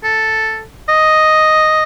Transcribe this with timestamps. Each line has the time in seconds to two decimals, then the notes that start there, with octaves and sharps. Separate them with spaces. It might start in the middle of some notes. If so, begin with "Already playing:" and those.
0.04 A4
0.89 D#5